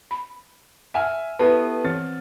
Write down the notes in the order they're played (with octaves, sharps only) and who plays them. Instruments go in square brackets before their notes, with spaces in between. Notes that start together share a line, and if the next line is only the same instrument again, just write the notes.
[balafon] B5
[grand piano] E5 G#5 F6 [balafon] F#5
[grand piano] B3 E4 [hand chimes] G4 A4 A5 [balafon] B4
[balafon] E3 [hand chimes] C4 [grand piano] A6